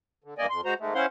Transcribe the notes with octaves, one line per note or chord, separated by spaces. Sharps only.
D3
E2 G2 A#3 D5 D#5 G#5
F2 C6
G#3 F#4 C5 A#5
G#2 D#3 G#3 A3
C#4 E4 C5 F5 F#5 C6